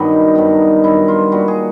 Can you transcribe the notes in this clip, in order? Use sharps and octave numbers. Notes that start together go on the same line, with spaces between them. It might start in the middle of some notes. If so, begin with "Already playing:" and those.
Already playing: G2 D#3 F#3 B3 D#4
G2 D#3 F#3 B3
G2 D#3 F#3 B3 E4
F4
A#2 G3 A#3 F#4
G#4